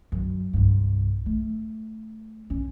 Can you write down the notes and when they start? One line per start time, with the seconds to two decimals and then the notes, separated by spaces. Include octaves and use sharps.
0.12 F#2
0.53 C2 G2
1.26 A3
2.50 C#4